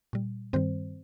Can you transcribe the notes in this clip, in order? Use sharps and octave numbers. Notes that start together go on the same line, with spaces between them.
A#2 G3
G2 D#3 G3 C4 C5